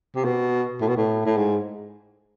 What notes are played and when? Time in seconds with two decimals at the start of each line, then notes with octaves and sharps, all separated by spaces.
0.15 C3
0.24 B2
0.81 A2
0.88 B2
0.96 A2
1.25 A2
1.37 G#2